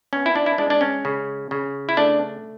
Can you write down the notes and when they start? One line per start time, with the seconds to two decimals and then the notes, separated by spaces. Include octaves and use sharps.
0.13 B3 C#4
0.26 E4
0.35 D4
0.46 E4
0.58 G#3 D4
0.70 D4
0.81 C#4
1.05 C#3
1.51 C#3
1.89 E4
1.97 A3 D4